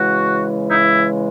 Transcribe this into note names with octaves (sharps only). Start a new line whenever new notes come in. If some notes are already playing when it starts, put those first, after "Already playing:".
Already playing: C#3 E3 G#3 F#4
D#4
E4